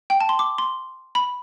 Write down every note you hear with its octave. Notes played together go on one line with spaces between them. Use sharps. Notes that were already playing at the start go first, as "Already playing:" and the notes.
G5
A5
C6
D6
C6
B5